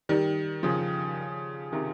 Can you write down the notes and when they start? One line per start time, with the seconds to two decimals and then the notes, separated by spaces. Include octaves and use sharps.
0.09 D#3 G3
0.63 C#3 F3
1.72 C3 D#3